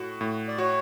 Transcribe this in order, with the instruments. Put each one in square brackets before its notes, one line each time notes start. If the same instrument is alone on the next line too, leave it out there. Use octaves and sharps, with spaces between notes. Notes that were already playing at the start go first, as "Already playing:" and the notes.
Already playing: [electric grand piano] A2 F#4
A2
[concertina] D5
[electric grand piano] F#4 [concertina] C#5